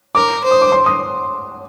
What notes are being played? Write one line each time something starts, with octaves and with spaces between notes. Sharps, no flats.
A#4 D6
C5
D#6
D6
C6
D#6